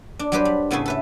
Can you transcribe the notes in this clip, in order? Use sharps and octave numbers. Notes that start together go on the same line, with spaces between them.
D4
F#3 G3 D4 G4 B4 C5
G3
A2 C#3 B3 G#4 A4 G#5
A4 B4 E5